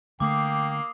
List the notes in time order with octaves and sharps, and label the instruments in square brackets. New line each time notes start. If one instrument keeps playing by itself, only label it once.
[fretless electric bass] D3 A3 [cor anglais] A#3 [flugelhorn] G5 [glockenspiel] D6 D#6 C7